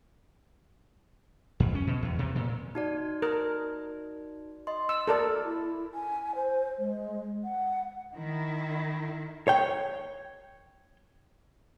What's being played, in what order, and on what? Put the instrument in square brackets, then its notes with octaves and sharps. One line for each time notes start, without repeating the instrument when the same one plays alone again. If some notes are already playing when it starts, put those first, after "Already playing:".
[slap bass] F2
C#4
B2
E2
C3
A#2
[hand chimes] D#4 F#4 D5
[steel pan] A#4
[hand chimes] D#5 C6
[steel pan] E6
[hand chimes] A#3 F#4 [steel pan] A4 A#4 D5
[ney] E4
G#5
C5
G#3
F#5
[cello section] D#3 E4
[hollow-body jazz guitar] C#5 G5